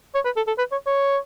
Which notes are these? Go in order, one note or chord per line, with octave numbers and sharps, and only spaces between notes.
C#5
B4
A4
A4
B4
C#5
C#5